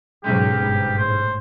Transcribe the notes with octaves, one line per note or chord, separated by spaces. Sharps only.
B1 G#2 C#3 F#3 G#3 G4
G1 G#2 B3
A2 C5